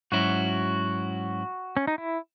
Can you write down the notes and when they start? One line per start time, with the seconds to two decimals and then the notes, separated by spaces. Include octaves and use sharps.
0.12 G#2 F#3 C#4 E4 F#4
1.77 C#4
1.87 D#4
1.98 E4